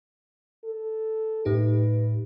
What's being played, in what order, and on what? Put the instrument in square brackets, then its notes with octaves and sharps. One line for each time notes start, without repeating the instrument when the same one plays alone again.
[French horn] A4
[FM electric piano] A2 D#4 G4 [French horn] B4